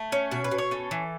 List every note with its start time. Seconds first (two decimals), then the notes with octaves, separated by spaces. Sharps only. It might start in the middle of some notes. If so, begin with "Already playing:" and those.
Already playing: A3
0.12 C#4
0.31 B2 F#4
0.44 B4
0.51 B2
0.58 C#5
0.71 C#4 A4
0.91 E3